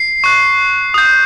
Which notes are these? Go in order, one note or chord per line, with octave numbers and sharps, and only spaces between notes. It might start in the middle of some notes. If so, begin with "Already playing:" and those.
Already playing: C7
C#6 F#6
D#6 G6